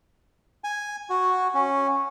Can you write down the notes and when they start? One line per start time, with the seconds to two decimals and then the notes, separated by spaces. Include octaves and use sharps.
0.64 G#5
1.10 F#4
1.54 C#4